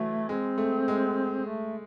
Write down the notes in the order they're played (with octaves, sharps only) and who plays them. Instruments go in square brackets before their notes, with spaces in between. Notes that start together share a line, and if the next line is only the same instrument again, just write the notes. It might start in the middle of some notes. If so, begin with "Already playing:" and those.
Already playing: [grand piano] E3 F#3 [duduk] A3
[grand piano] G#3 [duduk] C4
[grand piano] A3
G#3
[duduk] A3